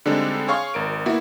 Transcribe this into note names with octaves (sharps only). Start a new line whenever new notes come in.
D3 G3 G#3 C4 D4 D#4
G#4 C#5 F5 C6 C#6
G#1 A#4 D7
A#3 B3 E4 F#4